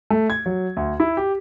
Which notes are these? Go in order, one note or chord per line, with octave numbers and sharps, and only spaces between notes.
A3
G#6
F#3
D2
E4
G4